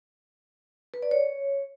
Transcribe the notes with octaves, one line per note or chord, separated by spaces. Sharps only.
B4
D5
C#5